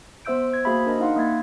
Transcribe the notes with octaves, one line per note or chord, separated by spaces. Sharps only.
B3 C5 E5 E6 G6 D7
G#6
A#3 F#4 G#4 C5 E5 B5
D4 A#4 D#5
D#4 F5 F#5 C6
A#3 E5 G#6 A6